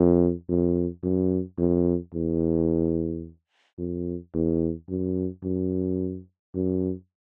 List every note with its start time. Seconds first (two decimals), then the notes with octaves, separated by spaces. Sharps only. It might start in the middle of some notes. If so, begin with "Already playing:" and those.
Already playing: F2
0.49 F2
1.03 F#2
1.58 F2
2.14 E2
3.78 F2
4.34 E2
4.89 F#2
5.43 F#2
6.55 F#2